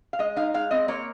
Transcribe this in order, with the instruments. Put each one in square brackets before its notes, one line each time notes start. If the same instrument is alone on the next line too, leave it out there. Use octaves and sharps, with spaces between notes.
[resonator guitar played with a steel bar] F5
G#3 D#5
D#4 F5
G#3 F5
C4 D#5
A#3 C#5